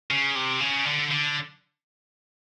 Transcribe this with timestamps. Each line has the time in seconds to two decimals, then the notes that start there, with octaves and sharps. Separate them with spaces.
0.10 C#3
0.35 C3
0.60 C#3
0.85 D3
1.11 D3